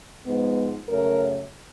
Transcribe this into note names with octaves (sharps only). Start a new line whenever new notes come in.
G#2 F3 G#3 B3
F#2 C#3 F#3 A3 C#4 A#4